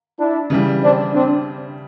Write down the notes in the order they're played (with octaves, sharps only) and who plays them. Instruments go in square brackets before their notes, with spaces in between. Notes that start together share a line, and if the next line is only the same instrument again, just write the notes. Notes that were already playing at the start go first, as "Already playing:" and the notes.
[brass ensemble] D4 E4
[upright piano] C#3 E3 G3
[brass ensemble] C4 D4
C4 D4